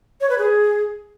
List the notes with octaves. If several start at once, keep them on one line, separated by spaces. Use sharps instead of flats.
C#5
B4
G#4